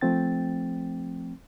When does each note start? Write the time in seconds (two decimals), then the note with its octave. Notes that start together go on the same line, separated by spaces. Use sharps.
0.01 F3 A3 C4 G5 A6